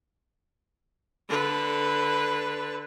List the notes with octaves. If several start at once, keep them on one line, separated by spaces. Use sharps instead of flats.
D3 B4